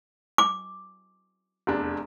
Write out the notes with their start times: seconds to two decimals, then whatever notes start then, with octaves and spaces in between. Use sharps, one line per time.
0.38 D6
1.67 F1 E2 D4